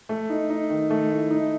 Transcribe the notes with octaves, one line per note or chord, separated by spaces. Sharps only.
A3
D#4
D#4
D#3
A3
E4
D#4